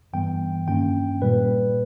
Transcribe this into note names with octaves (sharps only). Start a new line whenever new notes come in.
G2 E3 G3 B3 G5
G2 D#3 A#3 C#4 G5
A#2 G3 A#3 B4